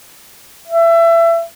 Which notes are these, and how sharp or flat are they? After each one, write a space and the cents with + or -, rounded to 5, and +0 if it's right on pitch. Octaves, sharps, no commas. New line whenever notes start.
E5 +25